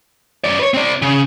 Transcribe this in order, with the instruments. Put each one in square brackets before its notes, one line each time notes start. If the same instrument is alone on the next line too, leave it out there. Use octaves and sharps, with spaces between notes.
[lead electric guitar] F#2 D5
B4 C#5
C4 D5
C#3